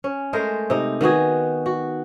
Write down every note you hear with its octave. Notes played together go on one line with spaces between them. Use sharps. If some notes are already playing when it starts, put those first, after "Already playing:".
C#4
G#3 A3 A#4 C5
C3 D#4
D#3 B3 F#4 G#4
F#4